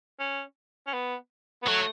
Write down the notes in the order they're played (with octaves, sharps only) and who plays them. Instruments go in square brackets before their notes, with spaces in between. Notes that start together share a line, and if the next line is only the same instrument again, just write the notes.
[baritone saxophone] C#4
C#4
B3
B3
[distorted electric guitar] F#3 [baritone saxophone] A3